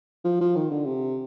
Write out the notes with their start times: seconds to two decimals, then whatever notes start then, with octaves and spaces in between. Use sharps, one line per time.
0.25 F3
0.41 F3
0.56 D#3
0.71 D3
0.86 C3